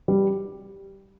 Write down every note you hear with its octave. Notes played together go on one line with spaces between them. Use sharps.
G3